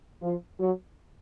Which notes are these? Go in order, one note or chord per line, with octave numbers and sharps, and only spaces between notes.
F3 F4
F#3 F#4